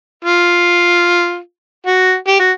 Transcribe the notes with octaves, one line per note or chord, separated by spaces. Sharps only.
F4
F#4
G4
F#4